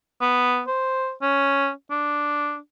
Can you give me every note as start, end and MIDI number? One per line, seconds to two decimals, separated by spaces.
0.21 0.62 59
0.68 1.12 72
1.22 1.70 61
1.90 2.57 62